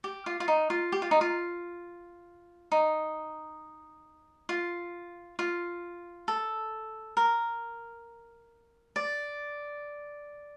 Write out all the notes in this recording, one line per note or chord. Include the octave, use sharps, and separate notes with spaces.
G4
F4
F4
D#4
F4
G4
F4
D#4
F4
D#4
F4
F4
A4
A#4
D5